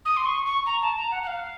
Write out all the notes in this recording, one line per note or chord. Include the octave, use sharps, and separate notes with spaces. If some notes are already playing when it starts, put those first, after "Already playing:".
D#6
C6
C#6
C#6
A#5
A5
A#5
F#5
F#5
F5